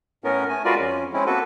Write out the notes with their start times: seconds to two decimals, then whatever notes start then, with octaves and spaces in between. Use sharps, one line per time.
0.24 A2 B3 C#4 A#4
0.49 A3 G#5
0.65 G#3 F4 F#4 A#4 B4 D5
0.79 F2 C#4
1.13 G#3 C4 C#4 E4
1.26 A#3 B3 F#4 A4 B4